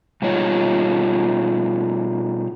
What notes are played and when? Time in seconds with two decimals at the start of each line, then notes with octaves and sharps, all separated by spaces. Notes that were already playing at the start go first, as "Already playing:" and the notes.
0.22 B2 G3 D#4 F4 C#5